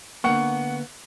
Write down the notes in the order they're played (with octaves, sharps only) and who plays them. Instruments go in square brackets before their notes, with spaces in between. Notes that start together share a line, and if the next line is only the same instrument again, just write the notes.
[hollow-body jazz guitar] D3 A#3 B3 [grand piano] F#5 C#6